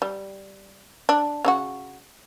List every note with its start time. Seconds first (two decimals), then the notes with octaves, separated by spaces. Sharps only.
0.02 G3
1.09 D4
1.45 C#3 D#4 F#4